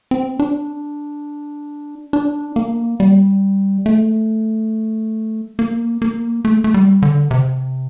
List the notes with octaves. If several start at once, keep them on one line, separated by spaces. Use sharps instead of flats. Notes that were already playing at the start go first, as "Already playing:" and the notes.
C4
D4
D4
A#3
G3
A3
A#3
A#3
A3
A3
G3
D3
C3